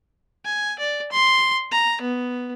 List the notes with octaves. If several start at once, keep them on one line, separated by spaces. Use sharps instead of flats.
G#5
D5
C6
A#5
B3